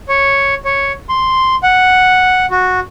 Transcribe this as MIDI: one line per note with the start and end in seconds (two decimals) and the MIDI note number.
0.09 0.54 73
0.65 0.92 73
1.09 1.55 84
1.63 2.46 78
2.51 2.80 66